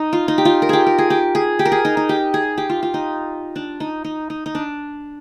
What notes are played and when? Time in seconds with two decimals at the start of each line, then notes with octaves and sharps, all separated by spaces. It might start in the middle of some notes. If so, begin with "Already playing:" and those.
Already playing: D#4
0.13 F4
0.28 D#4
0.38 G4
0.45 F4
0.62 A#4
0.69 G4 G#4
0.87 A#4
0.98 G#4
1.10 G4
1.35 G#4
1.59 G4
1.65 A#4
1.72 G#4
1.85 D#4
1.97 D#4
2.09 G4
2.34 G#4
2.58 G4
2.70 F4
2.83 F4
2.94 D#4
3.56 D4
3.80 D#4
4.04 D#4
4.30 D#4
4.46 D#4
4.55 D4